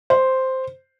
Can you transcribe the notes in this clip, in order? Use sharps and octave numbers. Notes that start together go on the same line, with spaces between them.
C5